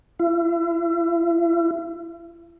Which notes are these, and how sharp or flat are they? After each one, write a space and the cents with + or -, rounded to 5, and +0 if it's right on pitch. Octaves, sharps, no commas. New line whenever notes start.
E4 +40